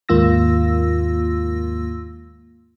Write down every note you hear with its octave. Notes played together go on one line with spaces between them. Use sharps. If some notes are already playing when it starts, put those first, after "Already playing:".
D#2 G#2 A#3 F4 E6 A#6